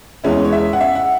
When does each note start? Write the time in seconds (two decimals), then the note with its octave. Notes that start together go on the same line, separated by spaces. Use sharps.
0.24 E2 E3 G#3 C#4 E4
0.45 C#5
0.52 E5
0.73 F#5
0.81 E5
0.95 F#5